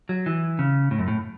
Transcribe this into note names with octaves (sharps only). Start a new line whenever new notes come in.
F#3
E3
C#3
A2
F#2
A2